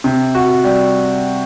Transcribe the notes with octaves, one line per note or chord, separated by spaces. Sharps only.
C3
F#4
G3